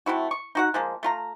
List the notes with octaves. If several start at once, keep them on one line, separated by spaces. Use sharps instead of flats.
C3 A3 E4 F#4
C#6
D#4 F#4 F#5
F3 G#3 A#3
A3 F4 A#5